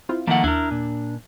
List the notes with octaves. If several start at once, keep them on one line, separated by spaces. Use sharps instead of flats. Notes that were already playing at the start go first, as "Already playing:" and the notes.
C4 E4 F4
D#3 F3 A3 A#3 F#5
D#2 D4 E4 A#4
A#2